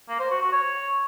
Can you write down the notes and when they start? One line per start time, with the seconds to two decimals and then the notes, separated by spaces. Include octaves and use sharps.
0.09 A#3
0.19 C5
0.30 F#4
0.41 F#4
0.52 C#5